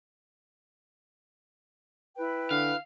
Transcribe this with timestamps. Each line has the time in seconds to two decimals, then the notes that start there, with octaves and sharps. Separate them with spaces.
2.16 E4 B4 G5
2.51 D3 F5